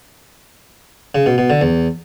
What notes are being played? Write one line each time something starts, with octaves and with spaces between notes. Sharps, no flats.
C#3
B2
B2
D3
E2